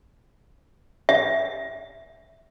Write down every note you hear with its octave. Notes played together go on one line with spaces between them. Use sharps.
E5